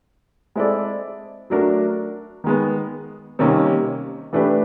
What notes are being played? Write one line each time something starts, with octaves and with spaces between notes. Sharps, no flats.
G#3 C4 E4 A4 D5
F#3 A3 D4 F#4 A#4
D#3 G#3 B3
C3 D#3 G3 A#3 C#4
E3 A3 D4 G4 B4